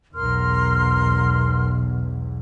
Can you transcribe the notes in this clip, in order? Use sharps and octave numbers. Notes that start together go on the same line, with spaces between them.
B1 E2 A#4 C6 F6